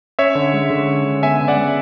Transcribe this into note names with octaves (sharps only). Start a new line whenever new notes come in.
C#4 C#5 E5
D3
G#3
D3
C#4
D3
B3 E5 G#5
C#3
D5 F#5
G#3